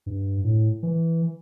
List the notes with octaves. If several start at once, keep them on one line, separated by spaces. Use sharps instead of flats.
G2
A2
E3